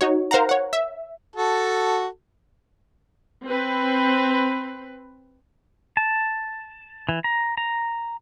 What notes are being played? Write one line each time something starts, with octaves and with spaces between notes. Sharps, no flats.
D#4 F#4 C#5
A#4 C5 F5 F#5 A#5
C#5 F#5
E5
F#4 A4 A5
C4 B4
A5
E3
A#5
A#5